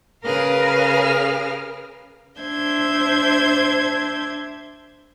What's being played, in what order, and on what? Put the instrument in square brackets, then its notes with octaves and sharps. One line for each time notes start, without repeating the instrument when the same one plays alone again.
[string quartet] C#3 G#4 A#4 B4 F5 F6
D4 C5 E5 G6 G#6